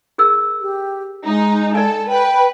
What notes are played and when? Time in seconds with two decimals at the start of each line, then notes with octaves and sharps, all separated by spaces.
0.18 G#4 A#4 E6
0.61 G4
1.26 G#3 D#4
1.75 A4 D5 G#5
2.09 B4 G5